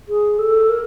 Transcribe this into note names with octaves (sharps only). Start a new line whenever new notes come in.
G#4
A4
A#4